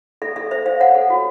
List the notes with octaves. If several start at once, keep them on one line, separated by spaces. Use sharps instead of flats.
A4 E5
A4 E5
C5 E5
C5 F5
C#5 F#5
A4
F#4